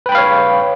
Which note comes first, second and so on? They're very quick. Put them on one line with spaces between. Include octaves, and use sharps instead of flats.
B4 G5 B5 F5 C#5